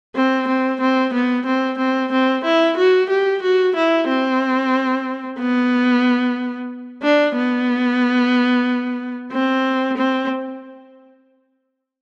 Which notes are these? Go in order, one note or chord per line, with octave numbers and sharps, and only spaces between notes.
C4
C4
C4
B3
C4
C4
C4
E4
F#4
G4
F#4
E4
C4
B3
D4
B3
C4
C4